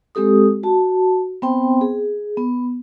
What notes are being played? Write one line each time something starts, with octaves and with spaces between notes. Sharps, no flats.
G#3 C4 G4 A4 D#6
F#4 A5
B3 C4 C5 G5 C6
G#4
B3